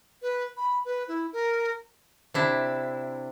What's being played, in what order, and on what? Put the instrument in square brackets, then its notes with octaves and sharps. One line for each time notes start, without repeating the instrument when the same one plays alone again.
[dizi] B4
B5
B4
E4
A#4
[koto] C3 D4 E4